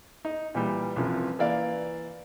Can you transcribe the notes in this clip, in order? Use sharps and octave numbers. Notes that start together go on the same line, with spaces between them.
D#4
A#2 E3 G3
C2 F#2 E3 F3
E3 A#3 D5 F5